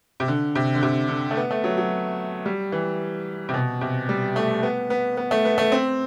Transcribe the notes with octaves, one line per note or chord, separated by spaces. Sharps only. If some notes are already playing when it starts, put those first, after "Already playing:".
C3
D3
C3
D3
C3
D3
A3
B3
A3
F#3
F#3
G3
E3
C3
B2
C3
G3
A3
B3
B3
B3
A3
B3
A3
C4